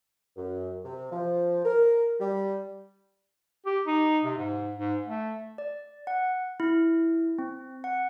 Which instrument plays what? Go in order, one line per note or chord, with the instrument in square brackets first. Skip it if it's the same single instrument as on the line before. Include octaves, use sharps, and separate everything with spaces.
[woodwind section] F#2
C3
F3
A#4
G3
[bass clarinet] G4
D#4
C3
G#2
G#2
A3
[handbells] D5
F#5
E4
C4
F#5